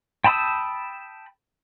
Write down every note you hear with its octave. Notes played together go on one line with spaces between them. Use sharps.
G5 A5 B5 D#6 E6